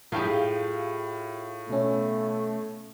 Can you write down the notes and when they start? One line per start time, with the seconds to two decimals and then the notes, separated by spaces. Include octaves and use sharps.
0.12 A2 F4 G4 G#4 F5
1.69 B2 A3 C#4